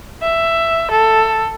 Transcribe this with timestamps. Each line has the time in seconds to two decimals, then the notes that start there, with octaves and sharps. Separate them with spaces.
0.22 E5
0.91 A4